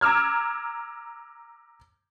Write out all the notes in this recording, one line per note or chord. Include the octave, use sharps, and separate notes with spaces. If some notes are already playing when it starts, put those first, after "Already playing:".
A#5 D6 E6 F6 G#6